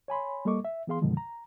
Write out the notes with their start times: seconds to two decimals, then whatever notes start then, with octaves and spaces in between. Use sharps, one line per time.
0.08 C#5 G#5 B5 C6
0.45 G3 A#3 A4 D#5 C#6 D6
0.65 E5
0.87 E3 B3 G#4 F5 C6
1.02 F#2 B2 D3 D#3 F3 G#3
1.17 A#5